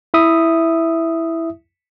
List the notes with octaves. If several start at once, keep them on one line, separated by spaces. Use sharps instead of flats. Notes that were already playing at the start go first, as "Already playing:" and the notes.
E4 E5 D#6